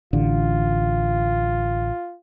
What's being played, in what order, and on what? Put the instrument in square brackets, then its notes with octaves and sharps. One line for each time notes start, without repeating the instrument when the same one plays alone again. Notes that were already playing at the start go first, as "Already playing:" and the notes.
[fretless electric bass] A1 D3 [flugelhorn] F4